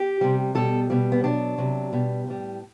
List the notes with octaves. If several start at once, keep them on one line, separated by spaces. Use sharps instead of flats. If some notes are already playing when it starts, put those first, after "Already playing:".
Already playing: G4
C3 G3
B2 G3 A4
B2 G3
B3
B2 F#3 D4
C3 F#3
B2 G3
A2 G3